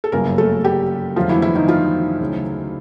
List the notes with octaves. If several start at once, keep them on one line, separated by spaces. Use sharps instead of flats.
A4
G1 F#2 C#3 A#3 A#4
A3 A4
G3 G4
F2 D3 F3 F#3 A3 F4
E3 E4
E3 E4
D#3 D#4
F3 F4
D2 C#3 F#3